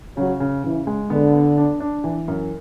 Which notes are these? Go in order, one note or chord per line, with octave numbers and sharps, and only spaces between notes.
C#3 F#3
C#3
C#3 E3
G#3
D3 B3
B3
D4
D4
E3
F#2